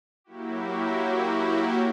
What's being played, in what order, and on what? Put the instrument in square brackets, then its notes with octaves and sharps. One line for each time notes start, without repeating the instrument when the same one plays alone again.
[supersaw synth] F#3 A#3 E4 F#4 G4